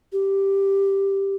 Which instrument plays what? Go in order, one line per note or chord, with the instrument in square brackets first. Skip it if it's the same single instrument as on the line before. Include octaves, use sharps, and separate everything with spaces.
[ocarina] G4